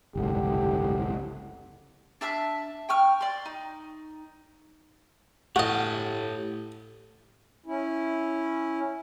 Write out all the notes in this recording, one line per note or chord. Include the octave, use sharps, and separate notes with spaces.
F#1 C2 G#2 D3 G4
D4 E5 A5 F6
G5 C#6 F6
D5 C6
D#4
A2 F#4 G4 A4 D#5
C#4 E4